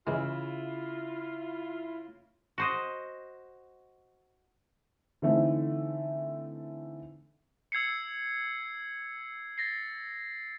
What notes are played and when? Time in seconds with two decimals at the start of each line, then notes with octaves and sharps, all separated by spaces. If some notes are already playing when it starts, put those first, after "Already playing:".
0.07 C#3 E3 G#3 E4 F4
2.58 F#4 C5 D#5
5.22 D3 E3 A3 C4 D#4
7.72 E6 G#6 C7 C#7
9.58 A6 A#6 C7